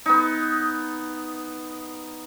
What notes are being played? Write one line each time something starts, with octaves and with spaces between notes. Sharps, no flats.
B3 D#4